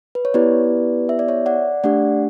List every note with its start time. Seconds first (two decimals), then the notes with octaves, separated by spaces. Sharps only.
0.15 B4
0.25 C#5
0.34 B3 E4 G4 B4 D5
1.09 E5
1.19 D5
1.28 C#5 E5
1.46 D5 F#5
1.84 A3 D4 G4 D5 F#5